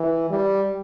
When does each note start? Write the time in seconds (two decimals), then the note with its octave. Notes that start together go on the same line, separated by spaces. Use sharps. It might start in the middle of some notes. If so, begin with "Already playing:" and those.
Already playing: E3
0.30 G3